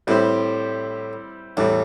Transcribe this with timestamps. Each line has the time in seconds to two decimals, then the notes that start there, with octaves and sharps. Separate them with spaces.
0.07 A2 G3 C4 E4 G4 C5
1.57 E2 A2 E3 G3